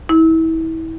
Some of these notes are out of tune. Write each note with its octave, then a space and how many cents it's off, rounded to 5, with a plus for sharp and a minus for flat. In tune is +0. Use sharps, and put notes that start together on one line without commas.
E4 -30